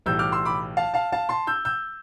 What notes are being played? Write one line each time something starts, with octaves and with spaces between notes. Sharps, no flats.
B1 A2 E3 G3 E6 G6
D6 F6
C6 E6
B5 D6
F5 A5
F5 A5
F5 A5
A5 C6
E6 G6
E6 G6